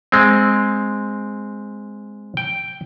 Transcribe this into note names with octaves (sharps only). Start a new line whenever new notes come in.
G#3 C4
G5